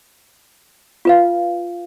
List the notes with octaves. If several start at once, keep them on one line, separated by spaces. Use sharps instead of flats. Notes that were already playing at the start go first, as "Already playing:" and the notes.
F4 B4 F5